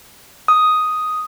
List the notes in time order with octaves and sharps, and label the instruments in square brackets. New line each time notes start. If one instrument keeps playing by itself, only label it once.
[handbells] D#6